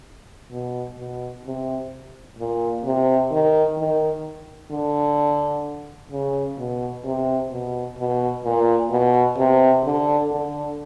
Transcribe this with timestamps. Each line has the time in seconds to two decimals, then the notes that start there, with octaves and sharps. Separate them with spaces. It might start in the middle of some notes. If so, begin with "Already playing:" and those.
0.51 B2
0.98 B2
1.45 C3
2.38 A#2
2.84 C3
3.31 D#3
3.78 D#3
4.71 D3
6.11 C#3
6.58 B2
7.04 C3
7.51 B2
7.98 B2
8.44 A#2
8.91 B2
9.37 C3
9.84 D3
10.31 D3